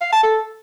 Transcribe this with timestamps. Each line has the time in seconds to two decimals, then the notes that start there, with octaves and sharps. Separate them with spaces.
0.01 F5
0.12 A5
0.23 A4